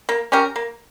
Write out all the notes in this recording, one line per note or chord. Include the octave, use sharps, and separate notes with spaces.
A#3
C#4 G4 A#4
A#3